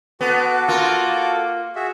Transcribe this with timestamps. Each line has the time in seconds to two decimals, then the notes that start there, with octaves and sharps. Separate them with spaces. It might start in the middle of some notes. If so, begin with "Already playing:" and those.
0.21 B3 F#4 A4 D6
0.68 A#3 F4
1.76 F#4 G#4 E5